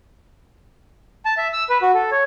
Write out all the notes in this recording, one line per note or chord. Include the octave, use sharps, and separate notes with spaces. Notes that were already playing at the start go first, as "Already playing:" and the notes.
A5
E5
E6
B4
F#4
A4
C#5